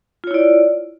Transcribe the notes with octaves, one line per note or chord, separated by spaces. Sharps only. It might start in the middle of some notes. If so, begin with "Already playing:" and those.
E4 F4 C#5 D5